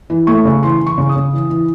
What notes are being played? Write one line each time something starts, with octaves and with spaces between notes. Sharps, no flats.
E3
A3 C#6
C#3
E3 C6
E3
C#6
C#3
D#6
C#3
E3
E3